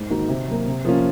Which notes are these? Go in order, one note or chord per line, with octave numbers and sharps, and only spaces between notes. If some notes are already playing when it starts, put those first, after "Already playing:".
Already playing: G#2
D#3 A#3 D#4 F#4
C3
F#3 A#3
C3
F3 A#3 C#4 F4